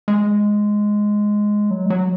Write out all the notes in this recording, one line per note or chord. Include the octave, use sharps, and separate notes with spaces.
G#3
F#3
G#3
F#3